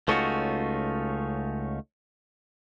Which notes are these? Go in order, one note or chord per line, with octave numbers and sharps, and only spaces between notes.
C#2 A3 C#4 D#4 F4 F#4